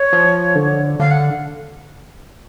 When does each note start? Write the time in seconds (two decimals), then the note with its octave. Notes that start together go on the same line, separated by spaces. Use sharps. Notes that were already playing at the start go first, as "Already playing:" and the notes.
Already playing: C#5
0.13 F3
0.55 D3
1.00 D3 F5
1.11 F#5